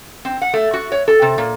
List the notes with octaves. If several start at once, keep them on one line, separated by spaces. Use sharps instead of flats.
C4
F#5
A3
F#4
C#5
A4
C3
A#2